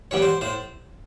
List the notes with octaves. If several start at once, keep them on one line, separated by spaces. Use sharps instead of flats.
E3 G3 B3 C#5
C5
A2 C5